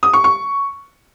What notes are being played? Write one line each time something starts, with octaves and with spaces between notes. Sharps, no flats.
D#6
C#6
C#6